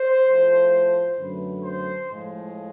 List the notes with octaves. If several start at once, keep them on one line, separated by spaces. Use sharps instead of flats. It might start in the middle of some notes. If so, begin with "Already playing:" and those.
Already playing: C5
A2 F3 A3
F#2 D3 F#3 A3 B4
C5
A2 F3 G#3